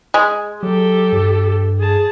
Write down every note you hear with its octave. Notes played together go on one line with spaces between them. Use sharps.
G#3
F#3 G4 A4
G2
G#4 A5